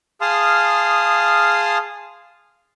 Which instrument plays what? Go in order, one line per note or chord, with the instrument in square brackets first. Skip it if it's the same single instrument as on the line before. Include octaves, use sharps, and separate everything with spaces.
[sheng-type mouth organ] G#4 F5 A5 C6 D#6 F6